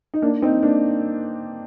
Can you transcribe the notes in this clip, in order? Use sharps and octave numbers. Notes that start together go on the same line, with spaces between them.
D#4
A#3 D4
C4 D#4
A#3 D4